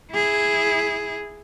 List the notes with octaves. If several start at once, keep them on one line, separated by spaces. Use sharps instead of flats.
E4 G#4